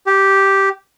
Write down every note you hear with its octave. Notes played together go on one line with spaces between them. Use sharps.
G4